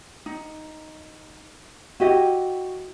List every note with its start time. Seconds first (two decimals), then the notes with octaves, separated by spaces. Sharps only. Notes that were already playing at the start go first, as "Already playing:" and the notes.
0.26 D#4
2.00 E4 F#4 G4 D#5